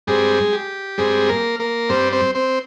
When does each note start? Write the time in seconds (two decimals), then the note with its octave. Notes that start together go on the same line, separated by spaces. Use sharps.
0.07 G2 G3 G#3 C4 G#4
0.53 G4
0.98 G2 G3 G#3 C4 G#4
1.29 A#3 A#4
1.60 A#3 A#4
1.89 G2 G3 C4 C5
2.13 C4 C5
2.35 C4 C5